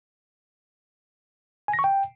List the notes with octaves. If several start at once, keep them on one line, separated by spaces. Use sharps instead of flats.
G#5
A#6
C#6
G5